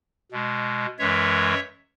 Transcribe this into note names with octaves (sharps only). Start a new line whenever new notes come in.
B2 G#3
F#2 E3 G#3 C#5 E5